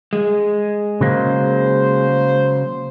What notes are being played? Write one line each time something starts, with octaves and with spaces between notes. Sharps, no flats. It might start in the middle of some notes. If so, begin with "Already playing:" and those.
G#3
C#3 F#3 A#3 C5